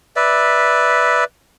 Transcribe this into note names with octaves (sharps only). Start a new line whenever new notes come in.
B4 D5 E5